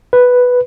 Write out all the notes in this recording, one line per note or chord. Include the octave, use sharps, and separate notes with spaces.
B4